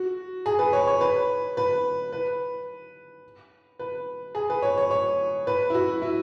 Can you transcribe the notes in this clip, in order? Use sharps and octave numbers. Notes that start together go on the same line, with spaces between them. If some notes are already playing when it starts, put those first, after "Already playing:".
Already playing: F#4
G#4
B4
C#5
C#5
B4
B4
B4
B4
G#4
B4
C#5
C#5
C#5
B4
E4
F#4
E4